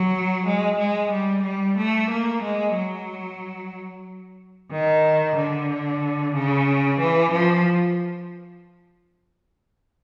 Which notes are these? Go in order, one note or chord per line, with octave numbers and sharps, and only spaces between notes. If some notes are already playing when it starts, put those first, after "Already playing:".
Already playing: F#3
G#3
G#3
G3
G3
A3
A#3
G#3
F#3
D#3
D3
C#3
E3
F3